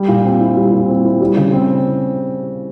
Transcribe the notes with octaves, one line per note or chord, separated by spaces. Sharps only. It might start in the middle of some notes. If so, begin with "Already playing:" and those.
Already playing: G3
A#2
C4
E4
G3
A#2
C4
E4
G3
C#3
C4